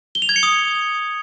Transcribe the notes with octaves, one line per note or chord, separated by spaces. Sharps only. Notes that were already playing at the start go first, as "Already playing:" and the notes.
G7
F7
G#6
C#7
D#6